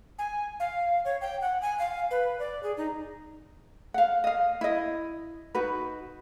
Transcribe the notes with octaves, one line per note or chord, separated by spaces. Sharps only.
G#5
F5
C#5
G5
F#5
G#5
F5
B4
D5
G#4
D#4
F5 F#5
D#5 F5
E4 D#5
D#4 F#4 B4